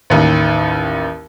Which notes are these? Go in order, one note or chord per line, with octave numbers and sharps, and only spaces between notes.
A1 D#2